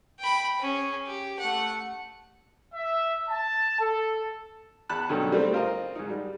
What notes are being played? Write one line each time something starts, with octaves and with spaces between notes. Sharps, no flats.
G5 B5
C#4 G#4
G4
A3 F#5
E5
A5
A4
E2 A5 B5 F#6
G2 B2 D3 F#3 C#4 D#4
G3 A3 C4
C4 F4 A#4 D#5
G#2 D#4
G3